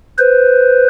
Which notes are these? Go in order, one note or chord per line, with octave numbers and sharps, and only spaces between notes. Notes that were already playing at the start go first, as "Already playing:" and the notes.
B4 C5